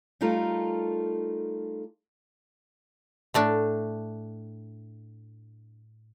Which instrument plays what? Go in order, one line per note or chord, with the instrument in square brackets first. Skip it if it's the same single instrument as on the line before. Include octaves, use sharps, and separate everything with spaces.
[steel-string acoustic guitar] G3 A3 D#4 F4 A4 A#4
[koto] A2 A3 D4